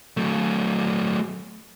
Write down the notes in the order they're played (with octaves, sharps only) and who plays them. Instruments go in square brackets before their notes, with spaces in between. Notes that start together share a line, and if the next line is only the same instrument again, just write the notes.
[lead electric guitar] F#3 A3